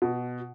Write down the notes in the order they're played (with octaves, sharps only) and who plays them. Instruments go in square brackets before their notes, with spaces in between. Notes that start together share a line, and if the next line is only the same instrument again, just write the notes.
[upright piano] B2